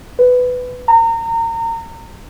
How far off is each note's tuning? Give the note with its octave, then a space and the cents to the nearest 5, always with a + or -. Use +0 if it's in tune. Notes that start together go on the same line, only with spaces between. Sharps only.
B4 +15
A#5 -30